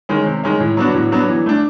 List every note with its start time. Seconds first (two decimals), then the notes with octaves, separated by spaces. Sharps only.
0.09 D#3 G#3 C#4
0.26 C3
0.44 D#3 G#3 C#4
0.60 A2
0.77 F#3 B3 D4 F#4
0.94 A2
1.11 F#3 B3 D4 F#4
1.29 E3
1.46 A3 D4